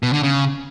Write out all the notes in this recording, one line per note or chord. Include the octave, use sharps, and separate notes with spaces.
B2
D3
C#3